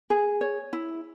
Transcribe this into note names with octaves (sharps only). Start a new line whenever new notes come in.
G#4
C#5
E4